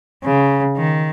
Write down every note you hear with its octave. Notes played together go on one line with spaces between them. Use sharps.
C#3
D#3